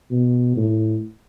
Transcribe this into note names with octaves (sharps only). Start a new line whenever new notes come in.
B2
A2